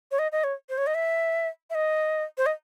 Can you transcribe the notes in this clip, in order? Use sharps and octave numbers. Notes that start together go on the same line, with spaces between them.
C#5
D#5
D#5
C#5
C5
C#5
D#5
E5
E5
D#5
C5
D#5